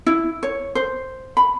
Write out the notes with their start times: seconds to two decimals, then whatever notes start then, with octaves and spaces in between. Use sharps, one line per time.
0.07 E4
0.43 C#5
0.75 C5
1.37 B5